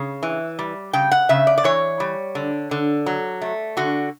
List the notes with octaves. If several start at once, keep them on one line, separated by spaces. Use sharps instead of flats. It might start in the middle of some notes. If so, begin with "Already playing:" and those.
Already playing: C#3
E3
G3
C#3 G5
F#5
C#3 E5
D5
D5
E3 C#5
G3
D3
D3
F#3
A3
D3 F#4